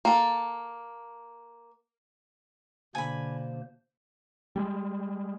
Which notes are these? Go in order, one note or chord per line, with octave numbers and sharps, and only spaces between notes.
A#3 A4
B2 D3 A#3 C5 G#5 B5
G3 G#3